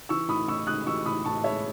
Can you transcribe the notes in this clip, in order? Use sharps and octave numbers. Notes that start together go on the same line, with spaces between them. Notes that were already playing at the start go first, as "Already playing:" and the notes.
E3 C#6 E6
A2 B5 D#6
A2 C#6 E6
G#3 D#6 F#6
E3 C#6 E6
A2 B5 D#6
A2 A5 C#6
G#3 C#5 E5